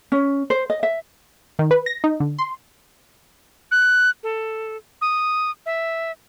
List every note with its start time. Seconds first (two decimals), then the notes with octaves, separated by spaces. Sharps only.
0.12 C#4
0.50 C5
0.70 D#5
0.83 E5
1.59 D#3
1.71 B4
1.86 A#6
2.04 D#4
2.20 D3
2.38 C6
3.71 F#6
4.23 A4
5.01 D#6
5.66 E5